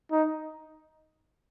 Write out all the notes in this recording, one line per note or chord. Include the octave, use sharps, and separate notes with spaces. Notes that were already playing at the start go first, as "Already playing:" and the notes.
D#4